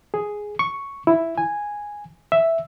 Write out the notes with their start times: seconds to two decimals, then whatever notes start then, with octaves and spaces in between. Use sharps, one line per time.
0.14 G#4
0.59 C#6
1.07 E4
1.38 G#5
2.32 E5